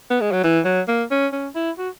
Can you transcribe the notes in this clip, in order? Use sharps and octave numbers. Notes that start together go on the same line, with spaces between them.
B3
G#3
F#3
E3
F#3
A#3
C#4
C#4
E4
F#4